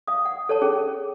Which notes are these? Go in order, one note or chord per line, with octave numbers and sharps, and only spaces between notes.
F5 D#6
F#5
A4 C#5 A5
C#4 G#4